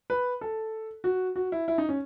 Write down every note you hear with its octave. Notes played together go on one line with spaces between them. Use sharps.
B4
A4
F#4
F#4
E4
E4
D#4
C#4